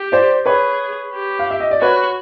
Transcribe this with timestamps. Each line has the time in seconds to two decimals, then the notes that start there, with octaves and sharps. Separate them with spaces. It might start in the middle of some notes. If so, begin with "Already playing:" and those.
Already playing: G4
0.12 C5 D5
0.46 G#4 B4 C#5
1.14 G4
1.39 F5
1.51 E5
1.60 D#5
1.71 D5
1.82 F#4 B4 C#5